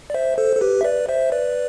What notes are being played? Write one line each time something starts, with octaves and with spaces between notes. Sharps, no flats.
D5
C5 E5
A4 C5
A4
G4 B4
E5
B4 D5
C5 E5
B4 D5